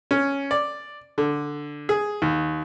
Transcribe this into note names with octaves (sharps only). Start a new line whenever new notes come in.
C#4
D5
D3
G#4
D#2